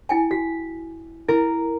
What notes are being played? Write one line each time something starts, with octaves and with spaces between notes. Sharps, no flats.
E4 G5 G#5
F#4 B6
E4 A#4